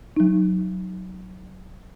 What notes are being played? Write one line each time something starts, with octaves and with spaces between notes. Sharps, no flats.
F#3 D#4